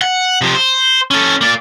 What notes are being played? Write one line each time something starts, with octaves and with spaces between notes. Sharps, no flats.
F#5
C3 F3
C5
C#4 A4
A#3 D5